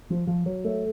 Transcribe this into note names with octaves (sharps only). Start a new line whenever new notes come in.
F3
F3
F#3
A3